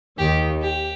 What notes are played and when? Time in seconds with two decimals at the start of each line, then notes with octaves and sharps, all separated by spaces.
0.18 D#2 D#3 G4
0.62 G4